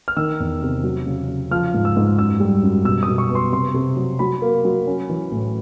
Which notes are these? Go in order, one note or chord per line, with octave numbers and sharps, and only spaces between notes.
F6
D#3 E6
E2
C3
F#3
C#3
C#3
F3 F6
G#2
E6
G#2
F#2 E6
G3
F#2
B2 E6
D#6
B2
C#6
B3
C6
C3 C6
C3
F#3
F#3 B5
A#3
F#3
C#4
E3
A2